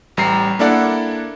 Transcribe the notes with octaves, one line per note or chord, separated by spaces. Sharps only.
A1 G3 A#5 C7
A#3 D4 E4 A4 D5 F#5